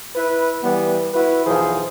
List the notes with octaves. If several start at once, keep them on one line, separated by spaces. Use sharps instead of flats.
E4 B4
E3 G3 B3
E4 F#4 B4
B1 E3 F3 G#4 C5